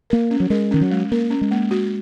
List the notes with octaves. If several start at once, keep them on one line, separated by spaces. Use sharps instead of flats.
A#3 A#4
C#4
F#3
G#3 A#4
D#3 C#4
F#3
G#3
A#3 A#4
C#4
G#3
A#3
F#4